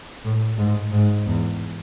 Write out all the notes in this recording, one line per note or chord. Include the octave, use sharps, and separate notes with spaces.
A2
G#2
G#2
E2